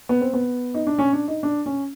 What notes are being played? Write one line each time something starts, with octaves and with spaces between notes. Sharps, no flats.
B3
C4
B3
D#4
D4
C#4
D4
D#4
D4
C#4